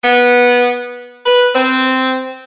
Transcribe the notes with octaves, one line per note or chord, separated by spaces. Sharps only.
B3
B4
C4